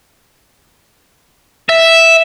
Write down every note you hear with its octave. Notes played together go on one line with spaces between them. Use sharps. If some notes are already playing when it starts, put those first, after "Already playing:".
E5